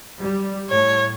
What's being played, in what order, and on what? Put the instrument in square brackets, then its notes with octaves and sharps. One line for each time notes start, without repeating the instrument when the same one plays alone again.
[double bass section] G3
[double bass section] A2 [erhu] C#5